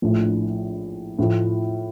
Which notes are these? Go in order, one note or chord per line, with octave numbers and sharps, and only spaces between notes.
A#1 A2 F3 A3 D4
A2 F3 A3